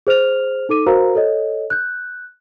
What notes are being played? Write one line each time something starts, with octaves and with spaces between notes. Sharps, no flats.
G#4 C5 F6 F7
D#4 A4 D6 D#7
F#4 A#4 C5 F5 A#5
A4 C#5 D#5
F#6 G6